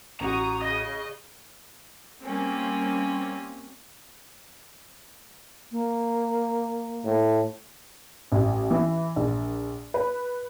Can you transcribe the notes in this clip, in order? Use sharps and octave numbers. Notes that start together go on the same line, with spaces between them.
A1 F#4 A#5 C#6 D#6
C#3 D#5
G3 A#3 C4 C#4
A#3
A2
A1
E3
A#1
B4